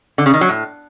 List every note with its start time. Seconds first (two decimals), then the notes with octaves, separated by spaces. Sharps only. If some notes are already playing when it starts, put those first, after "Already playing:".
0.18 D3
0.26 C#3
0.34 D#3
0.41 F#3
0.49 A2